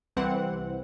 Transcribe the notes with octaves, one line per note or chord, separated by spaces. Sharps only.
C2 E3 C4 F#5